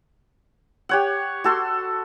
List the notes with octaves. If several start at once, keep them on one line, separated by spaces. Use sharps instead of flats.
G4 C#5 F#5
F#4 A4 C6